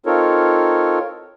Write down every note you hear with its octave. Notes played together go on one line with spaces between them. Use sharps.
C4 D#4 F4 A4 A#4 C#5